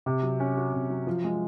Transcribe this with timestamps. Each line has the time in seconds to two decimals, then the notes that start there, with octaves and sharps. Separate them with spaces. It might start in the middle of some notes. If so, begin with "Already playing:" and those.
0.06 C3
0.23 F#3
0.40 C#4
0.57 F#4
0.73 C3
0.90 F#3
1.07 F3
1.24 G#3